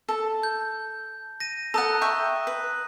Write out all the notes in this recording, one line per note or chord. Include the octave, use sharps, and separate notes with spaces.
A4
G6
A#6 D#7
A4 F#5 A#5 D#6 F#6
E5 G5 C#6
B4